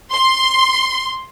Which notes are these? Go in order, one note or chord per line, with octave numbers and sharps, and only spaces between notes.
C6